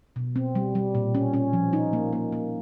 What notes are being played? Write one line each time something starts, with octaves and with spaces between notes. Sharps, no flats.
B2
C4
G3
G3
A#2
C#4
C#4
F3
D#4
A#3
A#3
A#3